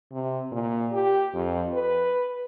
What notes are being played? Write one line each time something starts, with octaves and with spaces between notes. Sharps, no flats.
C3
A#2
G4
F2
B4